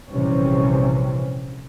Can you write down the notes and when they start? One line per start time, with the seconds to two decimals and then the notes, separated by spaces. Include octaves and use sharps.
0.11 A#1 C3 E3 G3 C4 C#4